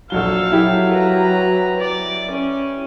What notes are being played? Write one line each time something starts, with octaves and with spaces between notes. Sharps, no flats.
A#1 F#3 A4 F5 G7
F#3 E4 G4
B4 A#5
D5
C#4